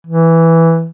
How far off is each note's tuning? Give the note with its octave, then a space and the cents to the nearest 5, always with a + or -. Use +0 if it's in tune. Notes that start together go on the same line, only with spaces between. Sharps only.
E3 +0